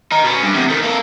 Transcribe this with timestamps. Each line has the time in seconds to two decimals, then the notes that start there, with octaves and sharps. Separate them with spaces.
0.12 D#4 A#4
0.24 B2 C#4
0.43 G2
0.54 E2 C3
0.70 D#3 A3
0.83 A#3 A4